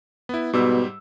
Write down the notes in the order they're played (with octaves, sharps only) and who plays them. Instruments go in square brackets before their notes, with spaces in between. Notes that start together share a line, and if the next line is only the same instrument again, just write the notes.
[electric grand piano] B3 E4
[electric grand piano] G#2 G3 E6 [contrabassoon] B2